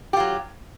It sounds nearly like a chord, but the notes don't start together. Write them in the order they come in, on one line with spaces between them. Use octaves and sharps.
G4 F4 F#3